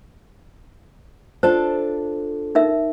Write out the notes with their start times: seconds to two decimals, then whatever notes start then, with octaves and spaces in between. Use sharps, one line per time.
1.43 D4 F4 A4 C5
2.55 D#4 A#4 E5